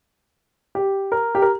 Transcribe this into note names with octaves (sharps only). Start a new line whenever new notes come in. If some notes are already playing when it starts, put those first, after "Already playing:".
G4
A#4
G4
A#4